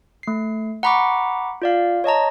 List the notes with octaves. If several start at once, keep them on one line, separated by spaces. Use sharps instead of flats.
A3 C7
F#5 A#5 B5 C#6 D6
F4 D5 F5
C#5 D#5 A5 A#5